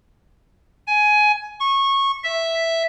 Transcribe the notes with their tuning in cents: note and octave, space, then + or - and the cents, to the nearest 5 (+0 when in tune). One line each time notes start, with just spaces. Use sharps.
G#5 +15
C#6 -20
E5 +0